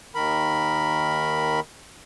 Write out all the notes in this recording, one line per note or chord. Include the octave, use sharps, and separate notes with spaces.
D#2 D#3 A#4 B5